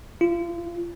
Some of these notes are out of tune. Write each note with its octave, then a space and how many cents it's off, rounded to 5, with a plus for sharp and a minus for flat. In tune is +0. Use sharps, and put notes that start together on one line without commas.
F4 -35